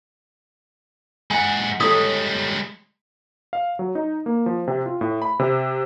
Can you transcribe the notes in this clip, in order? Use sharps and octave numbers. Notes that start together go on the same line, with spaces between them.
G#3 F#5 G#5
G3 G#3 A4 C#5 D#6
F5
F#3
D#4
A#3
F3
C3
F4
A2
B5
C3